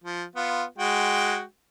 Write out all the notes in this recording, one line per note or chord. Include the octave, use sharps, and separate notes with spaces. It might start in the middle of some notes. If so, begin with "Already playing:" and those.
F3
B3 F4
G#3 F#4 G5